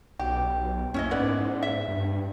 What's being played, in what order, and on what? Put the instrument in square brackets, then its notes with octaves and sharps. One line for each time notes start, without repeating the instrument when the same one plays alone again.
[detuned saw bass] B1 [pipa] G4
[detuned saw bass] F#2 [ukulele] C#4 E4 D#5
[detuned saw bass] G#2 [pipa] B3 B4 D5
[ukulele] E5
[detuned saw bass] G2